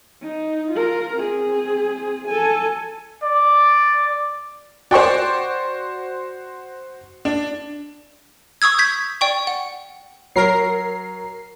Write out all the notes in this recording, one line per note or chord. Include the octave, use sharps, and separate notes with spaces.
D#4
F4 A#4
C4 G#4
A4 G#5
D5
F#4 C5 D5 G5 C#6
D4
C#6 D#6 E6 G#6
G6 G#6 B6
D5 G5 C#6
F#5
F#3 A#4 C#5 A#5 C7